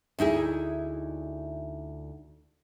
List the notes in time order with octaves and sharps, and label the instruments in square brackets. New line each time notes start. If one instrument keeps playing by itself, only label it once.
[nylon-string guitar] D2 D#4 E4 G#4